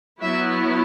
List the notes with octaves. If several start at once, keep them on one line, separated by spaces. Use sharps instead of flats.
F#3 B3 E4 E5